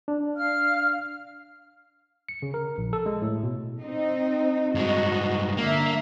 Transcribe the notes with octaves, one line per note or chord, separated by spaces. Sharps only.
D4
F5 F6
C#7
C#3
A#4
A#1
A4
G#3
A2
B2
C4 D#4
G2 G#3 F#4 D#5
D3 A#3 E5